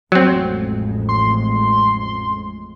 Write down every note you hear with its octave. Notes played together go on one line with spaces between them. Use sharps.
A1 F2 F#3 G#3 C4
C6